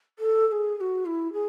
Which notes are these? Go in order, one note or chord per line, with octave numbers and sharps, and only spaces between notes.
A4
A4
G#4
G#4
F#4
E4
G#4